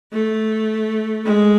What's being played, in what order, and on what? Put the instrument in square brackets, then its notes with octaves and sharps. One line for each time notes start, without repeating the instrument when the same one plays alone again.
[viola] A3
G#3